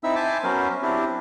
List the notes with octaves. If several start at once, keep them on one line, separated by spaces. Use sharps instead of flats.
C4 D#4 E4 E5 E6
C5 E5 G#5 A5 D6
F#3 B3 C#4 A#4 C5
C4 D4 E4 G4